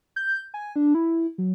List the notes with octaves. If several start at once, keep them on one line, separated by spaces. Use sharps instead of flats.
G6
G#5
D4
E4
F#3